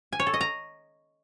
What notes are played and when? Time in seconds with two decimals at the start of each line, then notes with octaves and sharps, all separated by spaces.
0.13 G#5
0.20 C#5
0.27 A4
0.34 D#5
0.41 A#5